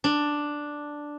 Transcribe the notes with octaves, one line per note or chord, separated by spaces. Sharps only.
D4